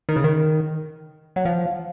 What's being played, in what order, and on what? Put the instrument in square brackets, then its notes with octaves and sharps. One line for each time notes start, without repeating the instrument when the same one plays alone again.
[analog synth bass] D#3
C#3
D#3
F#3
F3